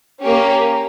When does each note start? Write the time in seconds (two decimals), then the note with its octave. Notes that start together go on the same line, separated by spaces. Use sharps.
0.24 A#3 C#4 G4